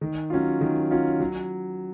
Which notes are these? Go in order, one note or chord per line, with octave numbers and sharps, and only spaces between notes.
D#3
F#3 C#4 F4
D#3
F#3 C#4 F4
F#3